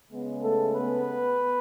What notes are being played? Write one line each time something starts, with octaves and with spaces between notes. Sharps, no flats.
C#3 G#3 B3
A3 A4
B3 B4